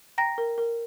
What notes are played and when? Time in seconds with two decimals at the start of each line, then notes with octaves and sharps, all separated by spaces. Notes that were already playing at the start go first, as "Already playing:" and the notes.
0.18 G5 A#5 A#6
0.38 A#4
0.58 A#4